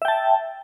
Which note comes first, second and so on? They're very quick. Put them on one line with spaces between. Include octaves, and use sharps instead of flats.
E5 G5 A5